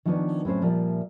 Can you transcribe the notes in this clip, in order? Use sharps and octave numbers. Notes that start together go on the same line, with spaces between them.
D#3 F3 G3 B3 C#4 D4
A2 F#3 C4 C#4 C5
A#2 F3 G3 A#4 E5